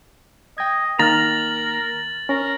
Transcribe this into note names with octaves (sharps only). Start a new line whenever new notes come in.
D#5 G5 G#6
D#3 A#3 A#4 A#5 F6 A6 F#7
C#4 A#4